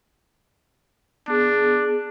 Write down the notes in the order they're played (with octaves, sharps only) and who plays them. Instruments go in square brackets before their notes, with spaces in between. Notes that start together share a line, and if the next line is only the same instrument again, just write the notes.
[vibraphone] B3 G#4 [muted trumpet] D4